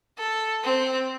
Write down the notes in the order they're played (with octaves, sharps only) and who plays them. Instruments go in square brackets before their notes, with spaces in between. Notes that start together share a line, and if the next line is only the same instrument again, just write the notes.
[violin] A4
C4